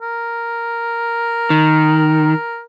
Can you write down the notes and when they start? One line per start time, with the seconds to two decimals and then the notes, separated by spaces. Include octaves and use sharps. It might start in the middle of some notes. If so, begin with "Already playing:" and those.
0.02 A#4
1.50 D#3